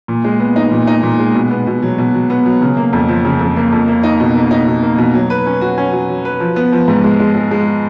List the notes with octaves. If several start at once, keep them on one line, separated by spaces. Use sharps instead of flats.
A#2
G#3
B3
D#4
A#2
D#4
A#2
G#3
B2
B3
B2
F#3
B2
F#3
B3
F#3
C#3
A#3
F2
F3
C#3
F2
A#3
F2
A#3
D#4
B2
A#3
D#4
B2
A#3
B2
F#3
B4
C#4
F#4
C#4
F#3
F#3
B4
F3
B3
F3
G#2
G#3
G#3
G#3
G#3